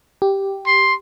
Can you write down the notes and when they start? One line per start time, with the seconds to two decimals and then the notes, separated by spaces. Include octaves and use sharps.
0.22 G4
0.67 C6